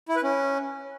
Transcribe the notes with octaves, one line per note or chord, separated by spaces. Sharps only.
E4
B4
C#4